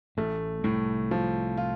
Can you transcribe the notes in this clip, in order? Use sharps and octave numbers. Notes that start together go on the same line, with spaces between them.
A1 A2 A3
C2 A2 C3
F3
F4